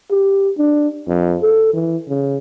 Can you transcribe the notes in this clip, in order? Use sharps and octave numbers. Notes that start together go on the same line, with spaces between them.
G4
D4
F2
A4
E3
C#3